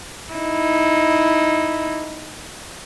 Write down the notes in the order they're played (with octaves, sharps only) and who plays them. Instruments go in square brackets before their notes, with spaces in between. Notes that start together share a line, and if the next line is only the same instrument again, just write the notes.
[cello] D#4 E4